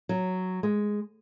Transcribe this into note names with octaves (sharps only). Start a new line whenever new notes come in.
F#3
G#3